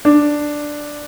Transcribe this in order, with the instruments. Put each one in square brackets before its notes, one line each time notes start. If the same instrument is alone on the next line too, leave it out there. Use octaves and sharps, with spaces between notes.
[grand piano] D4